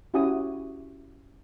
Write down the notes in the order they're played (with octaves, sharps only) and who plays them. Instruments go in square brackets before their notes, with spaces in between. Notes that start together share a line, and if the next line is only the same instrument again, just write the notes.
[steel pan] C#4 E4 F#4 G4 G#5 D#6